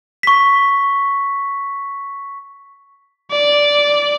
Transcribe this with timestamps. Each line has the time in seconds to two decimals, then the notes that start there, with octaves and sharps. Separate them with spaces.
0.23 C#6 B6
3.32 D5